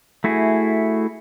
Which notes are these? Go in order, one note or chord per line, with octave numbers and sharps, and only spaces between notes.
A3 E4 F#4 G#4